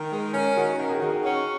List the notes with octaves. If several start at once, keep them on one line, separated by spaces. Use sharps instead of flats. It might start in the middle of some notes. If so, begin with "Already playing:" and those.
Already playing: D#3 A#4
G#3 A#4
C#4 A#4
D#3 F#4
D#3 A#4
G#4
D#3 F#4
G#4
C#4 F#4